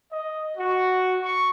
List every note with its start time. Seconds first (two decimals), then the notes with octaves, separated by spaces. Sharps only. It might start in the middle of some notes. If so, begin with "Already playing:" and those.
0.11 D#5
0.57 F#4
1.22 C#6